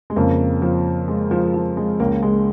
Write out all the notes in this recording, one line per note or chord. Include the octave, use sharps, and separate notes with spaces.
G#3
F2 C#3 A#3
F3
G#3
F3
F3
G#3
C#2 C#3 A#3
G#3